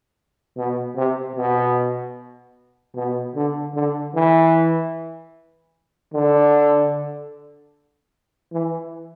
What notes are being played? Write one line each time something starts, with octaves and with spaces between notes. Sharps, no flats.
B2
C3
B2
B2
D3
D3
E3
D3
E3